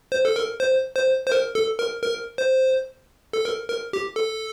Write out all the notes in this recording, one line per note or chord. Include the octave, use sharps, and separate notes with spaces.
C5
A4
A#4
C5
C5
C5
A#4
A4
A#4
A#4
C5
A4
A#4
A#4
G4
A4